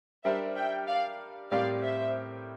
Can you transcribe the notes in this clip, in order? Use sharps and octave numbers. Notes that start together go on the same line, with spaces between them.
G3 D4 G4 A#4 C5 E5
E5 G5
D5 F5
A2 G3 C4 G4 A#4 D5 F5
C5 E5